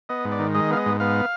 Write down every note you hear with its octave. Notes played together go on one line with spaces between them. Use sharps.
B3 D#5
G#2
D5
D#3
G#3 D#5
B3 F5
D#5
G#2
B3 F5